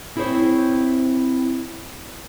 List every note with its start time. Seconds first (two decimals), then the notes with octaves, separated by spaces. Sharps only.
0.16 C4 E4 G#4 A#4 C5 C#5